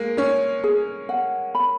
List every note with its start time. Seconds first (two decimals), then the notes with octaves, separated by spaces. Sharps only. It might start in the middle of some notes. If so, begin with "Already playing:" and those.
Already playing: G#3 A#3
0.17 C#4 C#5
0.64 G#4
1.09 F#5
1.55 B5